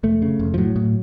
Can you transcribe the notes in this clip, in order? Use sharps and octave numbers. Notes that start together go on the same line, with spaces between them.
F1 A3
C#3
F1
F3
A2 F#3
A2